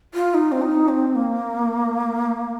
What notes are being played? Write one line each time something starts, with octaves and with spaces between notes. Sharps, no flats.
F4
D#4
C4
D#4
C4
A#3